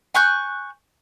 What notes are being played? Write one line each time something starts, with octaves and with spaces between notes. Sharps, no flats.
G#5 C#6 F#6 G6